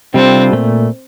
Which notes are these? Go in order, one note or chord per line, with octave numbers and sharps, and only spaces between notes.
C3 G3 C4 D4 F4 A4
A#2 A3